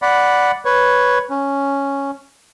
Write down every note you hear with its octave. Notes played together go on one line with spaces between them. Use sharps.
D5 F#5 B5
B4 C#5
C#4